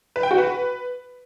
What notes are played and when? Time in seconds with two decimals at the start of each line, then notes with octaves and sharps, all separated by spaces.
0.16 B4
0.23 G5
0.31 F#4
0.38 B4